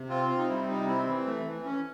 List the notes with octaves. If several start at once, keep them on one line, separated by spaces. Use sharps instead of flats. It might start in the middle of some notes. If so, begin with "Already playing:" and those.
Already playing: C3
C4 F4
C4
D#4
G3 E4
C3 D#4
C4 E4
E3
A3
E3
C#4